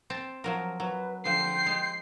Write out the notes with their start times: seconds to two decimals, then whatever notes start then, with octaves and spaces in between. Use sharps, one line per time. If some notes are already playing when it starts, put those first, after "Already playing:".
0.10 C4 G5 A5
0.44 F3 F#3 A#4
0.80 F#3 B4
1.25 D3 F3 G5 C6 G6 C7
1.66 G#3